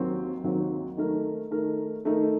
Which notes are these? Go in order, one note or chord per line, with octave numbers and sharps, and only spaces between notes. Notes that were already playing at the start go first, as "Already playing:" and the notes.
Already playing: D#2 D#3 F#3 C4
D#2 D#3 F#3 C4
D#3 A3 D#4 A#4
D#3 A3 D#4 A#4
D#3 A3 D#4 A#4